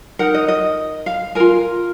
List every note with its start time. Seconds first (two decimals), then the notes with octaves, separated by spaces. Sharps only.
0.19 D#4 A#4 F#5
0.34 D#5
0.48 D#5
1.06 F5
1.35 F4 A#4 G#5